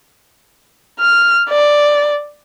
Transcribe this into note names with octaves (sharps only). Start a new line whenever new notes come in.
F6
D5